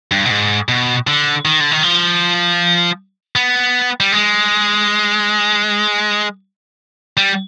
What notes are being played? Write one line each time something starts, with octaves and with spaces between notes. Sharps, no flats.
G2
B2
G#2
B2
D3
D#3
D3
D#3
F3
B3
G3
G#3
G3